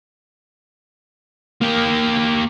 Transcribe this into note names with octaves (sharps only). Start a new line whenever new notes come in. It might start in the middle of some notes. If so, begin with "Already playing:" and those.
A#3 G4